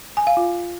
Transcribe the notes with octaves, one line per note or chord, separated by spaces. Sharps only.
G#5
F5
F4